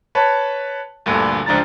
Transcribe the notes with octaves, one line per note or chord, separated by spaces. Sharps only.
B4 C#5 A5
D2 G2 A#2 D3
C#2 F3 D4 A#5 A6